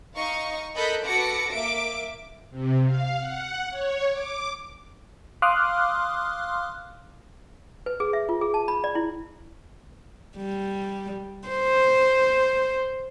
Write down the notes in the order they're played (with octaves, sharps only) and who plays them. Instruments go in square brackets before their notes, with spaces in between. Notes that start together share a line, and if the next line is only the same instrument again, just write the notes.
[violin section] D#4 D#5 F5 C#6
A4 A#4 D#5 B5 F#6 G6
F#4 A4 B4 D6 A#6 C#7
A#3 E5 D6 D7
[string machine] C3
F5
F#5
C#5
D6
[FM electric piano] F5 C6 D6 D#6 F6 F#6
[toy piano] B4
G#4
E5
F4
G#4
A5
B5
D5
E4
[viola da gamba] G3
C5